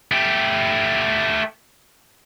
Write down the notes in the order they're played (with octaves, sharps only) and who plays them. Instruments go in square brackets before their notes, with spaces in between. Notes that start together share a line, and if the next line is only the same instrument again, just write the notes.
[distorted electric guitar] A3 G4